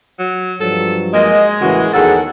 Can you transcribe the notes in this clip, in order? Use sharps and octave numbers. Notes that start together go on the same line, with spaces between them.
F#3
G2 F3 F#3 A4
G#3 A#3 D#5
A1 C#3 E3 A#3 F#4
E2 D#3 F#3 G#4 A4 F#5